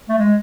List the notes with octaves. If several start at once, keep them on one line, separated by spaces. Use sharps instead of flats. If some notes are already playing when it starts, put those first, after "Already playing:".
A3
G#3